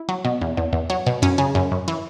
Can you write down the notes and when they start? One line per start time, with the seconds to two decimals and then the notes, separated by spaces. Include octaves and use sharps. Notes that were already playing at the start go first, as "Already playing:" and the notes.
Already playing: E4
0.09 F#3
0.25 B2
0.41 E2
0.57 E2
0.73 E2
0.90 F#3
1.06 B2
1.22 F#2 C#4
1.38 C#3
1.55 F#2
1.72 F#2
1.88 E3